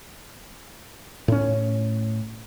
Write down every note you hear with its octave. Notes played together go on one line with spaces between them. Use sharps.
A2 C#4